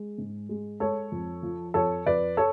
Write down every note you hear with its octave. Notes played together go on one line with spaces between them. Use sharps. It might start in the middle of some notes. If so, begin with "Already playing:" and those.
Already playing: G#3
G#2
G#3
G#3 A4 C#5
F2
F3
F2 A4 C#5
F2 B4 D5
A4 C#5